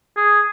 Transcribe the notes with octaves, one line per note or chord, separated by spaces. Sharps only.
G#4